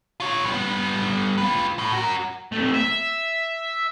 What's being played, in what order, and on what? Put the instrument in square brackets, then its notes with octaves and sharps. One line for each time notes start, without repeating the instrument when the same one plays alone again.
[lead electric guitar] F4 C#5
G3 B3
F4 B4
A2
F#4 A#4
[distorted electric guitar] C3 A3
E5